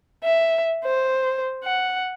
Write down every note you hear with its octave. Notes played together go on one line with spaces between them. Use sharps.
E5
C5
F#5